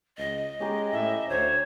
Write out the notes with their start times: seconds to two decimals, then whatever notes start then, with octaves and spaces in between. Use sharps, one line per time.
0.18 C#2 D#5
0.60 G#3 C#4 G4 A#4
0.93 A2 E5
1.29 D2 C5 C#5